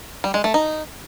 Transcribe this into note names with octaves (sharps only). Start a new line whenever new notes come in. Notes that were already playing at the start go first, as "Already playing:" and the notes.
G3
G#3
A3
D#4